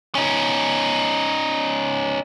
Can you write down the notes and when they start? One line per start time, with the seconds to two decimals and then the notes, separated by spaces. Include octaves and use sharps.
0.15 C#4 D#4